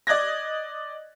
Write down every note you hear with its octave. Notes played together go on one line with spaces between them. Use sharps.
D5 D#5 F#6 G#6 A#6